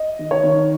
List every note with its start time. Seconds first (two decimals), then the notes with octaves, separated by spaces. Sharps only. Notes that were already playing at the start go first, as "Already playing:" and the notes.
Already playing: D#5
0.19 D#3
0.31 C#5
0.44 D#3